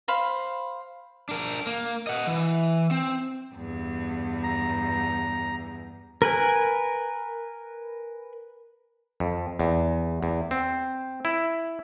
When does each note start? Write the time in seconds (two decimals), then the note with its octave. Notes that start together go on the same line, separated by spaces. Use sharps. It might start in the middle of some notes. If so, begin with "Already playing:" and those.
0.08 C5 F5 B5
1.29 D4 A#4
1.67 A#3
2.07 D#5 F#5
2.27 E3
2.91 C4
3.55 E2 G2
4.43 A#5
6.22 A#4 B4 G#5
9.20 F2
9.59 E2
10.23 E2
10.51 C4
11.25 E4